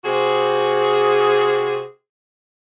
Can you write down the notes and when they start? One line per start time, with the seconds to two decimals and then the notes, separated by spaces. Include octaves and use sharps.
0.05 C3 C4 F#4 G#4